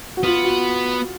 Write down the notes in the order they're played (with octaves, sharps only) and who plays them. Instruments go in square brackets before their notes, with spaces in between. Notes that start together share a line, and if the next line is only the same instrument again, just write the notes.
[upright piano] F#4
[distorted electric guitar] B3 [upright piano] F4
[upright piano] F#4